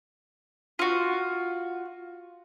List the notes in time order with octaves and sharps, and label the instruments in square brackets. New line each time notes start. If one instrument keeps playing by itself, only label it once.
[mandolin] F4 F#4